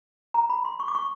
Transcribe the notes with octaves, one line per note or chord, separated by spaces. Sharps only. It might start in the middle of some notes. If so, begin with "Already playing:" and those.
A#5
B5
C6
C#6
D6
C#6